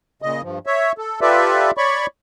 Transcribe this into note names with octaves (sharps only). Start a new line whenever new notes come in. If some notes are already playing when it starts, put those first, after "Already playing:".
A#2 C#3 D#5
G2 F3
C#5 E5
A4
F4 G4 A4 B4 D5 E5
C#5 D5 B5 C#6